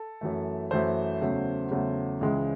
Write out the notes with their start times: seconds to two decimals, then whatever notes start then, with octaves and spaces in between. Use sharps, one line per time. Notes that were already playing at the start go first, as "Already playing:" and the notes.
Already playing: A4
0.21 F#2 E3 A3
0.71 F#2 E3 A3 C5
1.21 E2 C#3 F#3 A3
1.71 E2 C#3 F#3 A3
2.21 C#2 C#3 E3 G#3